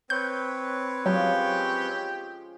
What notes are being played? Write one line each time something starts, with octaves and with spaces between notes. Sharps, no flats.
C4 B4 C#5 G6
F3 F#3 G#3 C#4 G4